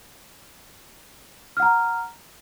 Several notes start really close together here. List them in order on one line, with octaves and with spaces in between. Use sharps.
F6 F#5 A#5